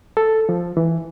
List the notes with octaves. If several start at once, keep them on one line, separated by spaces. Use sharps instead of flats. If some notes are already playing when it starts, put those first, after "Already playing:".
A4
F3
E3